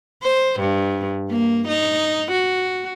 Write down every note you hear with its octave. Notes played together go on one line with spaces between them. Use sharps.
C5
G2
A#3
D#4
F#4